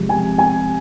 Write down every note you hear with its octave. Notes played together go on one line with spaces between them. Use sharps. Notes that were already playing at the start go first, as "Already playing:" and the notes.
Already playing: C3 F3 G#3
G#5
G#5